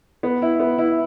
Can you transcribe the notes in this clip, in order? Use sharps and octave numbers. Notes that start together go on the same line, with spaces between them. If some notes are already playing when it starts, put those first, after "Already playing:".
B3
E4
B3
E4